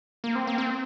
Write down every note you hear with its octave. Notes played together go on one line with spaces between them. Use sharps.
A#3
C4
A#3
C4